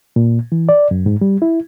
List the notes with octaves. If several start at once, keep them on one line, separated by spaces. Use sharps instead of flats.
A#2
E3
D5
F#2
G#2
G3
E4